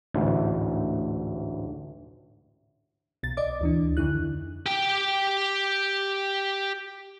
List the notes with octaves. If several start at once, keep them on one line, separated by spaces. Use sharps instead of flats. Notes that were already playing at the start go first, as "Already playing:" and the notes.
A1 D2 G#2
C2 B2 A6
D5 D#5 D6
D2 E3 D4
F2 D3 D#3 E4 F#6
G4 G5